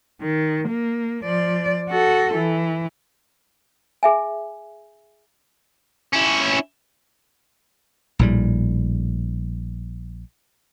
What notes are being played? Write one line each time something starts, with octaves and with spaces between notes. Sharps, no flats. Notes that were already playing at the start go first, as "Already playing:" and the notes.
D#3
A#3
F3 D5
F#4 A4
E3
G#4 E5 G#5
C#4 E4
A#1 A2 G3